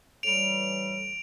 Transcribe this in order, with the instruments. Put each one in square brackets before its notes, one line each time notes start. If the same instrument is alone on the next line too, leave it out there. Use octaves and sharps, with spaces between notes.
[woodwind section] A2 E3 G3 [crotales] D7 F7